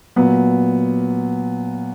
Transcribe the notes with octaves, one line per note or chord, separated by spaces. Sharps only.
A#2 F#3 B3